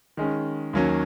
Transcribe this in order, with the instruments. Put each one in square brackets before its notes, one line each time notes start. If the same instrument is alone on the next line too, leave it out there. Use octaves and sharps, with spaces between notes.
[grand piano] D#3 G#3 C#4
D#2 D#3 F#3 A#3 C#4